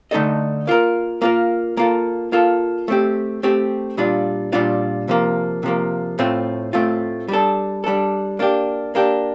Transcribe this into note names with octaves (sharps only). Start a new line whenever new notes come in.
D3 A3 D#4 A4 D#5
A#3 F4 A#4
A#3 F4 A#4
A#3 F4 A4
A#3 F4 A4
A3 C4 G4
A3 C4 G4
A#2 G3 D4 F4
A#2 G3 D4 F4
C3 F3 A#3
C3 F3 A#3
A2 A3 C4 F4
A2 A3 C4 F4
G3 D4 A4
G3 D4 A4
A#3 D4 G4
A#3 D4 G4